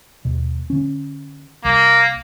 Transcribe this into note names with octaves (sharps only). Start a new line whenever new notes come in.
D#2 B2
D3 C#4
C2 A#3